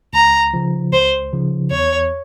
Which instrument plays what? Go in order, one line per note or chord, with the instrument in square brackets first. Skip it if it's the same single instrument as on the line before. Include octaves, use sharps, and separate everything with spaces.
[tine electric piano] C#2 [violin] A#5
[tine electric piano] C#3 F3
[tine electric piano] C#2 [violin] C5
[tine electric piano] C#3 F3
[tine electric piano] E2 [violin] C#5